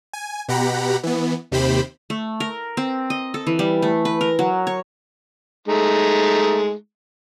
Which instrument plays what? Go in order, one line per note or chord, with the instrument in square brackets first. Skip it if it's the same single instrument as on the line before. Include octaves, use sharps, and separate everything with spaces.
[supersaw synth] G#5
B2 G4 F#5 A#5 B5
E3 B3
D#2 C3 G4 C5 B5
[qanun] A3
A#4
C4
D#5
A4
E3
G3
A3
B4
A#4
F#3
C#5
[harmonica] G#3 A3 D#4